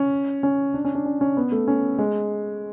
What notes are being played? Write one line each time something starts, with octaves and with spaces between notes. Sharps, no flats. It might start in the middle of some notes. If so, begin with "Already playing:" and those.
Already playing: C#4
C#4
D4
C#4
D4
C#4
C#4
B3
A3
C#4
G#3